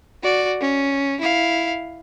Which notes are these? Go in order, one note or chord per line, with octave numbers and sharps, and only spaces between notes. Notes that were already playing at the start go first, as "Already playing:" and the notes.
F#4 D5
C#4
E4 F5